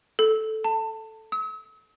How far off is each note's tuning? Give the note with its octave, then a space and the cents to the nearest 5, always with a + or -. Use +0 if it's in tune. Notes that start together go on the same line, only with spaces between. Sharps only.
A4 -5
A5 +25
E6 -45